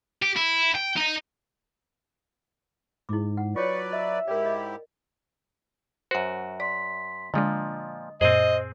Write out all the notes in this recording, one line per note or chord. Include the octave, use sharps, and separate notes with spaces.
G4
E4
G5
D#4 D#5
G#2 E4 D6
F#5
F#3 F4 B4 C#5 D5 C#6
D#5 E5
G#2 E4 G4 A#4 D5
D#5
F#2 F#4 C5 F#5
D5 C6 B6
A#2 D3 F3 G#3 D4 D#5
F#2 A#2 C4 G#4 C5 D#5